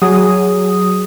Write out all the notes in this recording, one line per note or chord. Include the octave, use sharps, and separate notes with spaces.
F#3 G#4 D#6